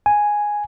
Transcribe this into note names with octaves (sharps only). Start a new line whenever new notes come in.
G#5